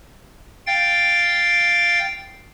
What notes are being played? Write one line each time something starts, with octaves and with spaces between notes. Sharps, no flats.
F5 G5 A6